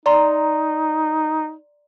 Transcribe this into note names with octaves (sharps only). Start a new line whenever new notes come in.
D#4 D5 A#5 C6